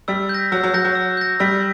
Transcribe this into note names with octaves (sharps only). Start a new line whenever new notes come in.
G3 E6
G6
A#6
F#3 E6
F#3
F#3 G6 A#6
F#3
E6
G6 A#6
G3 E6